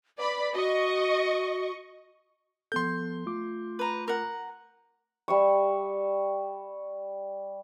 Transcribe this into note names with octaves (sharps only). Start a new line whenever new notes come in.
B4 D5 B5
F#4 D#5 C#6
F3 B3 A4 C6 G6
A3 F4 D6
B4 A#5
A#4 F#5
G3 E5 C#6